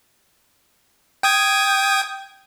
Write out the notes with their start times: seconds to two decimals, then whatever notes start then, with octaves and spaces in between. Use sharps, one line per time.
1.23 G5 D#6 G#6